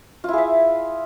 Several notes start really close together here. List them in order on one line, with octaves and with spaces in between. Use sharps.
F4 E4 G#4 E5